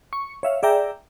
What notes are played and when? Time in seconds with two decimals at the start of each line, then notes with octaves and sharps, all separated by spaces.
0.13 C#6
0.43 C#5 E5 F5
0.63 G#4 D5 E5 G5 A#5